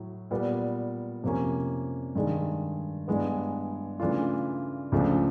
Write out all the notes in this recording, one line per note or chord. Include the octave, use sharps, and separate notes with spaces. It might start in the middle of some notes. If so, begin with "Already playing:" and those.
Already playing: A2 F#3
A#2 G3 B3
F2 C3 F3 A#3 C#4
G2 D#3 G#3
G2 E3 G#3 B3
C#3 E3 A3 D4 F4
C#2 C#3 F3 A3 D4